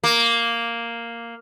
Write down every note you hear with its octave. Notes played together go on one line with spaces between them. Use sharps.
A#3